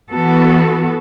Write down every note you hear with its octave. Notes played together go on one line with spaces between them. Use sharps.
E3 B3 F#4 A4